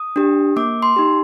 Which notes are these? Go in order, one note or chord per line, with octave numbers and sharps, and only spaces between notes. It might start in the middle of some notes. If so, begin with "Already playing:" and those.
Already playing: D#6
D4 G4
A#3 D6
C6
D#4 G4